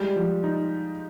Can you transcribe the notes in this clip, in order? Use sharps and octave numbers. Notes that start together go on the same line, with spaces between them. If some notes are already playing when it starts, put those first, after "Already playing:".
Already playing: G3 G#3
F3
D#4